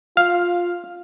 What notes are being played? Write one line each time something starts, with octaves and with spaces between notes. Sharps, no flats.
F4 F5